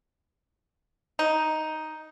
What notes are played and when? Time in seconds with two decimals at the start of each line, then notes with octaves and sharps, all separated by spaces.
1.19 D#4